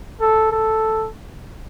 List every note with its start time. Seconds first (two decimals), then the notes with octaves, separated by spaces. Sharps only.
0.21 A4
0.51 A4